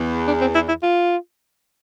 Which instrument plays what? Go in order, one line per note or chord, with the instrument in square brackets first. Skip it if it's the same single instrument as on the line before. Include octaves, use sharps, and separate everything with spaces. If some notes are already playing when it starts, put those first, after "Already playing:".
Already playing: [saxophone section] E2
[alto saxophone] D4
C4
E4
E4
F4